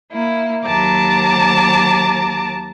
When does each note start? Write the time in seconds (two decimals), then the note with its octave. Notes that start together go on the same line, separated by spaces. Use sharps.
0.12 A#3 E4
0.65 D#2 F#3 A5 A#5 D6